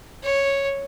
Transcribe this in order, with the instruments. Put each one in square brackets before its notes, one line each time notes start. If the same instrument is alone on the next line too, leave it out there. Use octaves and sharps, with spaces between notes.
[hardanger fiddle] C#5